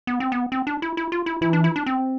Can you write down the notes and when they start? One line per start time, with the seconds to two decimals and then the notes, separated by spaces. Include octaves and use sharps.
0.07 B3
0.20 C4
0.32 B3
0.52 C4
0.67 D4
0.82 E4
0.97 E4
1.12 F4
1.26 E4
1.41 E3 E4
1.53 D4
1.64 E4
1.76 D4
1.86 C4